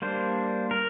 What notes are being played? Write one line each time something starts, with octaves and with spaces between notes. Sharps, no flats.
G3 A#3 D4 C5
A#4